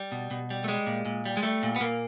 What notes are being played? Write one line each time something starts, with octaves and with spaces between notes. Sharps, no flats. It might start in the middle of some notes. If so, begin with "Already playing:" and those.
Already playing: G3
B2
B2
G3
A3
G3 G#3
A#2
A#2
G3
G#3
G3 A3
A#2
B3
A#2 A#3